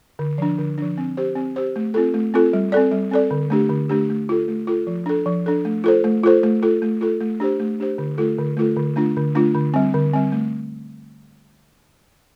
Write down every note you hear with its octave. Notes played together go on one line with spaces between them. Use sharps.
D3
F3 D4
D3
F3 D4
C4
G4 C5
C4
G4 C5
A3
C4 F4 A4
A3
C4 F4 A4
G3
C4 A4 D5
G3
C4 A4 D5
D3
A3 D4 G4
D3
A3 D4 G4
A3
F4 A4
A3
F4 A4
F3
D4 A4
F3
D4 A4
A3
F4 A4 C5
A3
F4 A4 C5
A3
F4 A4
A3
F4 A4
A3
D4 G4 C5
A3
D4 G4 C5
D3
A3 F4 A4
D3
A3 F4 A4
D3
A3 D4 F4
D3
A3 D4 F4
D3
G3 C4
D3
G3 C4
A3